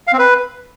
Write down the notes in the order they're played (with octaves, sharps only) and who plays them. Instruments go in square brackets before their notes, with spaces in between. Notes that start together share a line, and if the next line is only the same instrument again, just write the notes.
[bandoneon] F5
C4
B4